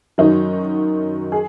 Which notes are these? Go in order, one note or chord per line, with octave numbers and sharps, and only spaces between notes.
F#2 D#3 F#3 D#4
G#4